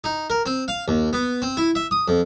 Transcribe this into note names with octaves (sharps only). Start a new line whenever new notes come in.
D#4
A#4
C4
F5
D#2
B3
C4
E4
E5
D#6
F2